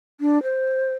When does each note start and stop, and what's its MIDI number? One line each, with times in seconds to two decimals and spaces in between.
0.20 0.42 62
0.43 0.94 72